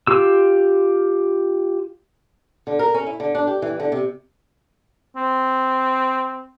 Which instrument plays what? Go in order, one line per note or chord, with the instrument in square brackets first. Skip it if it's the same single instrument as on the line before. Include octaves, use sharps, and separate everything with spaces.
[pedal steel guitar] F4 G4 E6
[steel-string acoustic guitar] D3
A#4
C#4
E4
D3
D4
G4
E3
D3
C3
[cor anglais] C4